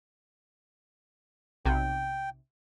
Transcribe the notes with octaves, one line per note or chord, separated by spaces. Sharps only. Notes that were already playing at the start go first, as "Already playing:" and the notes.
B1 C3 G5